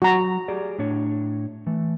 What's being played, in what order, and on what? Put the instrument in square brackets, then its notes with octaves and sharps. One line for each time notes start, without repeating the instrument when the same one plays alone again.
[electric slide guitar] F#3 [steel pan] F#4 A#5
[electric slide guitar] G4 G#4 D5
A2 D4 C#5
E3 A3